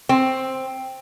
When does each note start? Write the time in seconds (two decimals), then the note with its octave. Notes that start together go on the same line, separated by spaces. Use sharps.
0.09 C4